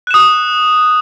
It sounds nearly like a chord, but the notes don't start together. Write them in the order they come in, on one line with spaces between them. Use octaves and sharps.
F#6 E7 D#6